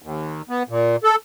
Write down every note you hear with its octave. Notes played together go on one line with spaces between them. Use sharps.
D#2
B3
A#2
A4